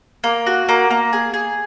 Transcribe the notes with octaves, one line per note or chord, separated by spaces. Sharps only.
A#3
F#4
A#3
A#3
G#4
G#4